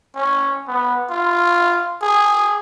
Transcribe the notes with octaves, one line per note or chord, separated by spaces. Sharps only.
C#4
B3
F4
G#4